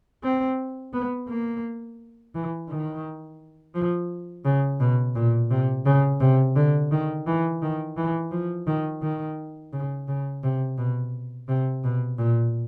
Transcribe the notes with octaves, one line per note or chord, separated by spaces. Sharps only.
C4
B3
A#3
E3
D#3
F3
C#3
B2
A#2
C3
C#3
C3
D3
D#3
E3
D#3
E3
F3
D#3
D#3
C#3
C#3
C3
B2
C3
B2
A#2